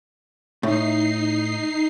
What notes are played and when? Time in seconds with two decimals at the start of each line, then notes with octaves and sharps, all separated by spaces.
0.63 A2 D#4 C7